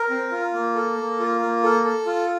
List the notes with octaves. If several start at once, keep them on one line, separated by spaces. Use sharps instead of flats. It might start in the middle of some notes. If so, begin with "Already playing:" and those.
Already playing: A#4
C4
F4
A#3
A4
A#3
F4
A#3
A4
A4
F4